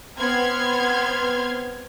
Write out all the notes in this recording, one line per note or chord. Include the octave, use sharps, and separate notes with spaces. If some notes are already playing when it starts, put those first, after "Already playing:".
B3 C4 C6 F6 G#6